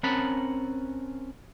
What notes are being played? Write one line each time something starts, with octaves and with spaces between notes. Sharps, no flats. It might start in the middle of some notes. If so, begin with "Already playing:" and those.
C4 C#4 A#4 F#5 A5 B5